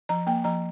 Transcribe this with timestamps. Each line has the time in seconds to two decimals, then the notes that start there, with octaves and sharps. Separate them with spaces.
0.09 F3 A#5
0.27 A#3 G5
0.44 F3 A#5